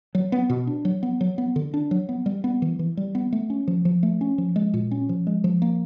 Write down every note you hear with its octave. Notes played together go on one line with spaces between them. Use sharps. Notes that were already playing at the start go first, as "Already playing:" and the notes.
F#3
B3
B2
D4
F#3
B3
F#3
B3
D3
D4
F#3
B3
G3
B3
E3
E3
G3
B3
A3
C#4
F3
F3
A3
C#4
F3
G#3
A#2
C#4
F3
G#3
F3
A#3